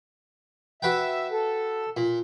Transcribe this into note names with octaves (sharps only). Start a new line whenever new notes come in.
F#4 B4 E5 G5
A4
A#2